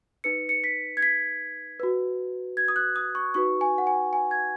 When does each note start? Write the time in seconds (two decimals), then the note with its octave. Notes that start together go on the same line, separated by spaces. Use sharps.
0.24 D#4 B4 C#7
0.49 C#7
0.64 B6
0.97 G#6
1.03 B6
1.80 F#4 B4
2.57 G#6
2.68 D#6
2.76 F#6
2.96 D#6
3.15 C#6
3.34 D#4 F#4 B4 C#6
3.61 G#5
3.78 F#5
3.87 G#5
4.13 G#5
4.31 G#6